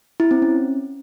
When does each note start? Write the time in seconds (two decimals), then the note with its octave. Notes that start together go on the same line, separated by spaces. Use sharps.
0.20 E4
0.31 C4
0.42 C#4